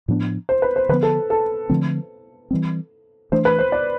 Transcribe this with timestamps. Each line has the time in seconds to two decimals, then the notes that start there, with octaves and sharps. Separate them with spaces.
0.08 A2 F3 B3 D4
0.49 C5
0.62 B4
0.76 C5
0.89 D3 F3 B3 B4
1.03 A4
1.30 A4
1.70 D3 F3 A3 C4
2.51 E3 G3 C4
3.32 E3 A3 D4 C5
3.45 B4
3.59 C5
3.72 D5